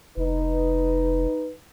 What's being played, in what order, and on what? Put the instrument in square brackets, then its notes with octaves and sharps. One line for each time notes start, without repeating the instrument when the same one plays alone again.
[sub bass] F1 [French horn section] D#4 B4